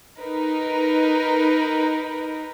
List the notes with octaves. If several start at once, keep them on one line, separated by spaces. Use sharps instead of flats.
D#4 A#4 B4